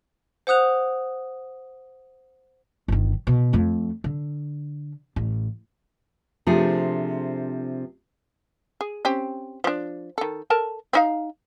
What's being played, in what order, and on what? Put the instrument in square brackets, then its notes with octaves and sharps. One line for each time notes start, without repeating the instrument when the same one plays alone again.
[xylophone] C5 F#5 D#6 F#6 F7
[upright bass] G1 D#3
B2
F2 A3
D3
A1
[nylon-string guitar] C3 F3 A3 D4 G#4
[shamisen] G#4
C4 C#4 G4
F3 D4
D#3 A4
A4 A#4 A5
C4 D#4 F5